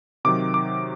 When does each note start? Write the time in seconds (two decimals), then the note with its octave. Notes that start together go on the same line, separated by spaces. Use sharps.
0.25 C3 D#3 F#3 D6
0.54 D6